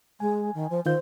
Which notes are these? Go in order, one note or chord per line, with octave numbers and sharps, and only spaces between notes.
G#3 G#5
D#3
F3
D#3 F4 C5 G6